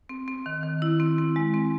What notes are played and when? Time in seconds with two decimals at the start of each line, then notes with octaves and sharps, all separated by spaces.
0.09 C4
0.28 C4
0.46 D#3
0.63 D#3
0.82 E4
1.00 C4
1.18 C4
1.36 G#3
1.54 C4